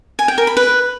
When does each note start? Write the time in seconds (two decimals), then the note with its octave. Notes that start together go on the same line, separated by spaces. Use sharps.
0.19 G#5
0.28 G5
0.38 A#4
0.47 B5
0.57 B4